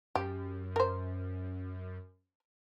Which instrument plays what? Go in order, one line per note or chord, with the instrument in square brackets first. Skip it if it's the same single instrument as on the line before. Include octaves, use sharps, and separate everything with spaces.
[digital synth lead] F#2 [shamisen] G4
[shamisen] A#4 C5